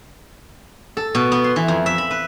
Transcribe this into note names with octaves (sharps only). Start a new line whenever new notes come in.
A4
B2
B3
C6
E3
F2
E5
B5
B4